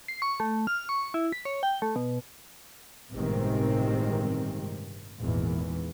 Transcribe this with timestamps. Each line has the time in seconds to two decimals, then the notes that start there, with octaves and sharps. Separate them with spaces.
0.08 C7
0.22 C#6
0.40 A3
0.67 F6
0.89 C#6
1.14 E4
1.32 B6
1.45 C#5
1.63 G5
1.82 A3
1.96 B2
3.12 G1 A2 C3 D#3 G#3 C4
5.20 G#1 E2 A#2 E3